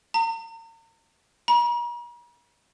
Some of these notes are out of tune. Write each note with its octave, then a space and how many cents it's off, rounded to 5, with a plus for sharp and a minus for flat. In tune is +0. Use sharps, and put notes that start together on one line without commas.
A#5 -40
A#5 +45